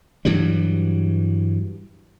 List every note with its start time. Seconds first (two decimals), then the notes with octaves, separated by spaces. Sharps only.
0.25 G2 E3 F#3 G3